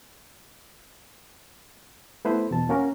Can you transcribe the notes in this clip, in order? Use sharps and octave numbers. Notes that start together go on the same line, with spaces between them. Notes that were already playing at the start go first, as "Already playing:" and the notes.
A3 B3 E4 B4 C5
E2 B2 A5
A#3 C#4 F#4 A#4